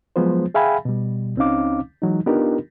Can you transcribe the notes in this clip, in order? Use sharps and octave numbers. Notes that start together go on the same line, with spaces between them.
F3 F#3 G#3 B3 F4 C5
G#4 E5 F5 G5 G#5 B5
B2 G3
C#2 C4 C#4 D#4 F5 D6
E3 F#3 G#3 D#4
B3 D4 D#4 F4 G4 A#4